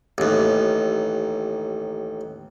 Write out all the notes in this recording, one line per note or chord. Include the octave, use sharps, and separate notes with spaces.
A1 D#2